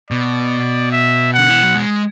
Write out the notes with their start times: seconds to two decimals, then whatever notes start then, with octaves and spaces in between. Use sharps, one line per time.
0.10 B2 D5
0.92 E5
1.33 D3 F#5
1.50 E3
1.63 F#3
1.75 G#3